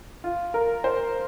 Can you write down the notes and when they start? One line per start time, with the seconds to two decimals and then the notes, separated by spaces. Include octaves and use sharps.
0.24 F4
0.54 A#4
0.84 C5